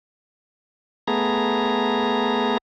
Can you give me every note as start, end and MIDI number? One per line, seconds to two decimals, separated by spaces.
1.07 2.58 57
1.07 2.58 59
1.07 2.58 68
1.07 2.58 82